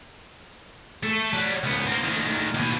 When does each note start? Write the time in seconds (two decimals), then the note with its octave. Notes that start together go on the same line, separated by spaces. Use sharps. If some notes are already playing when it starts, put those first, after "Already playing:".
1.03 A3 A4
1.33 F#3 G3
1.64 C#2 B3
1.87 A#3 C4
2.04 D2 D#3
2.54 D#2 B2